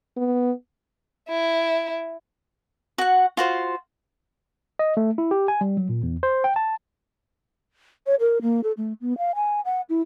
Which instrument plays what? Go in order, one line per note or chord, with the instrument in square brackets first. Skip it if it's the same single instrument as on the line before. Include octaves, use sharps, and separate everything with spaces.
[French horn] B3
[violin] E4
[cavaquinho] F#4 F#5
F4 F#4 C5
[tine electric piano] D#5
A3
E4
G4
G#5
G3
F#3
A#2
E2
C5
G5
A5
[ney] C#5
A#4
A#3
A4
A3
B3
F5
G#5
F#5
E4